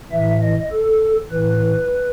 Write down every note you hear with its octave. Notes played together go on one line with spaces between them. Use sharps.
A2 E3 E5
D#5
A4
A2 E3 B4